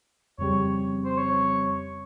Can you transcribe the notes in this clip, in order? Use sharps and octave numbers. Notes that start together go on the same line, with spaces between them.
F2 C#3 G3 C4 G4 C#5
C5
C#5